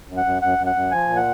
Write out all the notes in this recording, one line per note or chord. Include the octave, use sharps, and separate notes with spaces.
F#2
F#5
F#2
F#2 F#5
F#2
F#5
F#2
F3 G#5
A#2
F#5